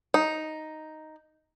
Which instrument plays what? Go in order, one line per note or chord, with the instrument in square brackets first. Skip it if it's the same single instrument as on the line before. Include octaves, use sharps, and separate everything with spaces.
[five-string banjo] D#4